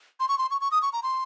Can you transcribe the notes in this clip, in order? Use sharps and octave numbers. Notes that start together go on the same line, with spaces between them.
C6
C#6
C6
C#6
C#6
D#6
C#6
A#5
C6